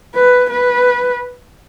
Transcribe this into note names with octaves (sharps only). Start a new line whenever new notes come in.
B4
B4